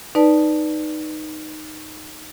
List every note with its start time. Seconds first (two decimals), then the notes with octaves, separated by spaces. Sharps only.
0.15 D#4 B4 D5 A5